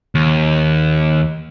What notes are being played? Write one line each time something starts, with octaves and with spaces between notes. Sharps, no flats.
D#2